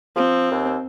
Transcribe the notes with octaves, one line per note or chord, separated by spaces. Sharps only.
F3 C4
D#2